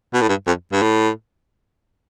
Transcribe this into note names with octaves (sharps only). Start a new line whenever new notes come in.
B2
A2
G2
F2
G2
A2